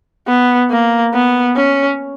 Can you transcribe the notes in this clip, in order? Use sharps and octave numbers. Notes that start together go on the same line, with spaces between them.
B3
A#3
B3
C#4